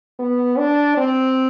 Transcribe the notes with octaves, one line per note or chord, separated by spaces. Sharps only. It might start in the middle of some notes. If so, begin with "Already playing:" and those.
B3
D4
C4